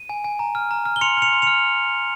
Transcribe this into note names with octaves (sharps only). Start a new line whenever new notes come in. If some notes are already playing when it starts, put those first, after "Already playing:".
Already playing: D#7
G#5
G#5
A#5
F6
A#5
F6
G7
C6 C#7 F7
F6 C#7 F7
C6
F6 C#7 F7